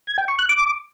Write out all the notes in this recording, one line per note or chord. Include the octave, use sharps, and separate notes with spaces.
G#6
G5
C#6
F#6
D6